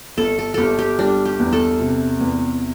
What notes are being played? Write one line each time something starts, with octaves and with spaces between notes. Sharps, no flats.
G1 A4
A4
G1 G4 A4
G4
G3 D4
G4
E2
A4
C3
E2